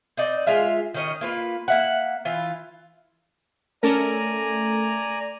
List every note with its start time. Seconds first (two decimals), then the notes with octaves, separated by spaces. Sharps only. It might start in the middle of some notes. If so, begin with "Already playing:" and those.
0.17 C4 D#4 D5
0.47 G#3 F4 E5 F5
0.94 D#3 C#4 D#5
1.21 A#3 F4 B4
1.68 A#3 E5 F#5
2.25 E3 F4
3.83 A3 C#4 A4 A#4 D5 G#5 A#5